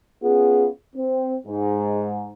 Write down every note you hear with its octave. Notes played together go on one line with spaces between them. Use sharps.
B3 C#4 F4 G#4
C4
G#2